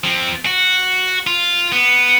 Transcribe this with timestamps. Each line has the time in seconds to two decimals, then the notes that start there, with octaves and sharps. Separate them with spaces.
0.04 F3 C4
0.46 F#4
1.27 F4
1.72 B3